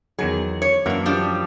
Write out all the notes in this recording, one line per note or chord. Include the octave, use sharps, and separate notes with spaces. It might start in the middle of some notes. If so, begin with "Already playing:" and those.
E2 D#3 F#3 G#4
C#5
F#2 E3 A#3 D4 F#4
F3 G3 D4